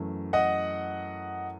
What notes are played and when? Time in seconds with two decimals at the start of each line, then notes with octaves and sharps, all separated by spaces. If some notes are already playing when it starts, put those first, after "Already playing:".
Already playing: F#2 E3 A3
0.33 D#5 F#5